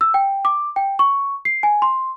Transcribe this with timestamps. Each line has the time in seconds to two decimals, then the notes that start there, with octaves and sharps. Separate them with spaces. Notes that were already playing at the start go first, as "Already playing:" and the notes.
0.01 E6
0.14 G5
0.45 D6
0.76 G5
0.99 C#6
1.45 C7
1.63 G#5
1.82 C6